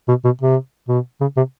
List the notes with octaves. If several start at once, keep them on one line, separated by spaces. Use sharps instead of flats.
B2
B2
C3
B2
C#3
C3